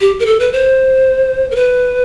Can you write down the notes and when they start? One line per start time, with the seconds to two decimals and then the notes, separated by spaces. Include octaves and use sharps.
0.01 G4
0.20 A#4
0.26 A4
0.40 B4
0.53 C5
1.51 A#4
1.56 B4